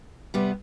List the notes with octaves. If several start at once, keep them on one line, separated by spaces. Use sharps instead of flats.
C3 G3 B3